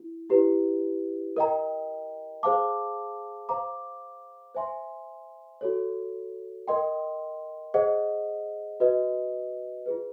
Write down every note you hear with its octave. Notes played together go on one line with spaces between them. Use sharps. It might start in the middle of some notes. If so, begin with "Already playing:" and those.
Already playing: E4
E4 G4 B4
A#4 D#5 G5 A#5
G#4 C5 F5 A5 D6
C5 F5 A#5 D6
C5 E5 G#5 C6
F#4 A4 C#5
A#4 D#5 G5 C6
G#4 C5 D#5 F#5
F#4 B4 D#5
F4 G#4 B4